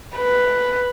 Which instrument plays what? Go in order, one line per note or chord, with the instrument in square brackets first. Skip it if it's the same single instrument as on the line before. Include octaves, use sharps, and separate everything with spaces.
[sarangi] B4